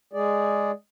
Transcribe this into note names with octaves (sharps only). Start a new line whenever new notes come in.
G#3 G#4 D5